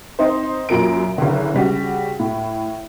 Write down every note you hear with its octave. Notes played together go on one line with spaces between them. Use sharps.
C4 D#4 C5
F#2 A#2 A#4 D7
F#1 D3
C#3 G3 F#4
A2